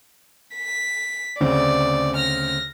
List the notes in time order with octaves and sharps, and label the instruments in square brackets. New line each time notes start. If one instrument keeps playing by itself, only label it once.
[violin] B6
[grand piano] D2 C#3 C4 [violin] D5
[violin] F6 A#6